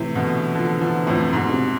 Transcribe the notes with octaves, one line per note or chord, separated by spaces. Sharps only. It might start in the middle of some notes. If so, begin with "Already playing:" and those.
Already playing: A2 C3 E3
B2 D3
D3 F3
D3 F3
F2 A2
G#2 B2
D3
C3